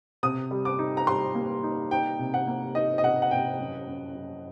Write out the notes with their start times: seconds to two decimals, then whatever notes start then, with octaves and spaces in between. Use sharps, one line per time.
0.23 C3 D#6
0.51 G3
0.65 D6
0.79 D#4
0.97 A#5
1.07 G3 C6
1.35 A#3
1.63 D#4
1.91 D#4 G5
2.19 C3
2.34 F#5
2.47 A#3
2.75 D#4 D#5
2.98 D#5
3.03 C3 F#5
3.22 F#5
3.31 C3 G5
3.59 F#2
3.88 F#2
4.15 F#2